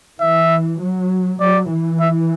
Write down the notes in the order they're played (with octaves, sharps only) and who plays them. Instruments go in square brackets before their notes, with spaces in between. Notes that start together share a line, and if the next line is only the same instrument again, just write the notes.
[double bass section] E3 [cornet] E5
[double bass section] F#3
[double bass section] F#3 [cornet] D5
[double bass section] E3
[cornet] E5